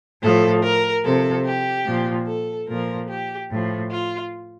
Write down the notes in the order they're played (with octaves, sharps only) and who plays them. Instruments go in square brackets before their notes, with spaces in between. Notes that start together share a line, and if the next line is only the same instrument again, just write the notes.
[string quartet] A2 F3 A4
A#4
C3 F3 A4
G4
A#2 F3
A4
A#2 F3 A#4
G4
A2 F3
F4